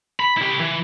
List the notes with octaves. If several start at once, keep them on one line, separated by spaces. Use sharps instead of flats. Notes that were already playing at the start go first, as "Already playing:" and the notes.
B5
E4 G4
E3